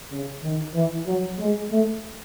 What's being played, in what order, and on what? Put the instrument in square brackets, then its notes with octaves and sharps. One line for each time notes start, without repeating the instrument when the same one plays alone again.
[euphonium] C#3
D#3
E3
F#3
G#3
A3